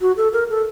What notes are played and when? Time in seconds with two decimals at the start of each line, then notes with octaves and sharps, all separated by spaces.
0.01 F#4
0.17 A4
0.33 A#4
0.50 A4